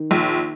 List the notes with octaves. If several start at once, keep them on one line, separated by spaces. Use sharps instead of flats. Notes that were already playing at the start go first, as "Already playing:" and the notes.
Already playing: D#3
A#1